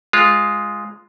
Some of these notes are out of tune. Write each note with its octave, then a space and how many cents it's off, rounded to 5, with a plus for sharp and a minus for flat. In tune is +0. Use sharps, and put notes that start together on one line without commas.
G#3 +0 F4 +0